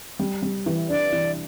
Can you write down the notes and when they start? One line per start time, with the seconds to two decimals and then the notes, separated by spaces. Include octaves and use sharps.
0.19 G3
0.42 G3
0.66 E3
0.89 D4 D5
1.13 E3